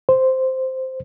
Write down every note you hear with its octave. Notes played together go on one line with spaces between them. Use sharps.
C5